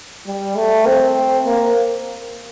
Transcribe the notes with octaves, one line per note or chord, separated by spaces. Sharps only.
G3
A3
C4
A#3